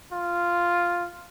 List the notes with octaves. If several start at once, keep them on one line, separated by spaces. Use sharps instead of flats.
F4